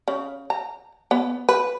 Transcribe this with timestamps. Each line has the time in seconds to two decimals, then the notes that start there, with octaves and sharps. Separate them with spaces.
0.08 C#3
0.50 A#5
1.11 B3
1.49 B4